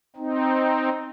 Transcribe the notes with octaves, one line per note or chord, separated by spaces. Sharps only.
C4 D#4